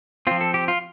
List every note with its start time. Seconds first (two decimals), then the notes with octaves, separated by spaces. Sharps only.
0.27 F3 C4 F4
0.41 A4
0.54 G4
0.68 F4